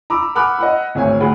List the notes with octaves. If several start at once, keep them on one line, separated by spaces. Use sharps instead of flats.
A#5 B5 D6 E6
F#5 G#5 B5 D6 F6 F#6
D#5 F#5 B5
G#1 D2 C#5 G#5
D2 G#4 F#5 B5